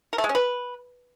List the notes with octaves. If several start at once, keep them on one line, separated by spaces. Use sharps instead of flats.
A#4
A3
G#3
C#4
B4